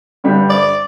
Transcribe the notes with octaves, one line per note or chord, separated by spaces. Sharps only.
G2 D3 G3 D4 G4
D5